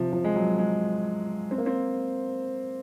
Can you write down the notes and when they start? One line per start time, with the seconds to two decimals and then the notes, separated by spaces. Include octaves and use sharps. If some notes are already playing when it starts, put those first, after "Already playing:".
Already playing: C3 F3
0.13 F3
0.24 G#3
0.35 F#3
0.59 G#3
1.51 C4
1.58 A#3
1.66 C4